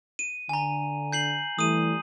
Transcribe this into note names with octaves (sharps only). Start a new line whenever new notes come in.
D#7
D3 G#5 A#5
G6 C7 F#7
E3 G3 A3 D#6 D#7